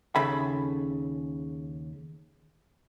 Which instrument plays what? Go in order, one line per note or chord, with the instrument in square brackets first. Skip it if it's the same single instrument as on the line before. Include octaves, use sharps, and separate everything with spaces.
[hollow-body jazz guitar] D#2 C#3 A4 E5 B5